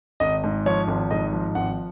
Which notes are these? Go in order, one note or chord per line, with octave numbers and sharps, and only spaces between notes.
G#1 D#5
G#2
F3 C#5
G#1
G#2 D#5
F3
G#1 F#5